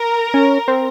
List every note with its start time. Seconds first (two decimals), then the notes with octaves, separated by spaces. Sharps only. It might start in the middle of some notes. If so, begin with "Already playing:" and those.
Already playing: A#4
0.34 C#4
0.68 C4